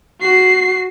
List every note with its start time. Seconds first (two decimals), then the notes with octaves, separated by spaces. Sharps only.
0.21 F#4 C7